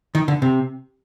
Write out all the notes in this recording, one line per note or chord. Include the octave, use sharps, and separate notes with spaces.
D#3
D3
C3